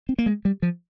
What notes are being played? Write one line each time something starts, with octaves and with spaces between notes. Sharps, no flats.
C4
A#3
G#3
G3
F3